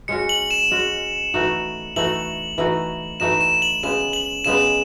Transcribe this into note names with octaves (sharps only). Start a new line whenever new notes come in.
G#3 C#4 F#4 C#7
F#7
E7
G#3 C#4 F#4
E3 A3 D#4 F#4
E3 A3 D#4 F#4 F#7
E3 A3 D#4 F#4
E3 A3 D#4 F#4 E7
E7
F#7
C#3 G#3 B3 E7
F#7
C#3 G#3 B3 E7